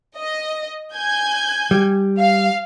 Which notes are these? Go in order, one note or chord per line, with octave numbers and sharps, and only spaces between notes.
D#5
G#5 G6 G#6
G3
F5